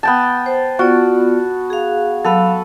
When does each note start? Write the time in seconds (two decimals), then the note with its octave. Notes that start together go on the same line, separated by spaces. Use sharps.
0.03 B3 G5 A5
0.46 C5
0.79 B3 F4 F#4 D5
1.70 G#4 F5
2.25 F#3 A4 B4 F5 B5